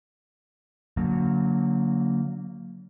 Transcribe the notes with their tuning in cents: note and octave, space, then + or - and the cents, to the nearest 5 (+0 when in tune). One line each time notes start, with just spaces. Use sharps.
D3 -40 F#3 -15 A#3 -10